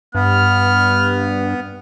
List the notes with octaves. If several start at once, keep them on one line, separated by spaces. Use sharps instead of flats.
G2 B3 F6